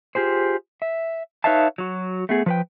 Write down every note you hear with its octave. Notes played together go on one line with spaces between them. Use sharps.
F4 G4 G#4 C5
E5
D#4 B4 C#5 E5 F5 A5
F#3 F#4
A3 B3 G#4
F3 B4 G5